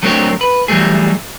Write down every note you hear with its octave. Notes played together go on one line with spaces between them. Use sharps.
F#3 A3 C4 D4 A#4 C#5
B4
E3 F#3 G3 A3 G#4